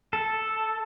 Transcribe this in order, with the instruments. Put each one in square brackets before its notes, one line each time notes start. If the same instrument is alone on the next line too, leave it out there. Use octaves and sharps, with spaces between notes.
[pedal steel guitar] A4